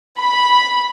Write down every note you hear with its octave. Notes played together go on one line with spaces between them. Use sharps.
B5